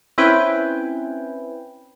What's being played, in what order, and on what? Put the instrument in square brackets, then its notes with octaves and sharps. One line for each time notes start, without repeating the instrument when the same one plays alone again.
[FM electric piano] C4 C#4 E4 B4 G5 G#5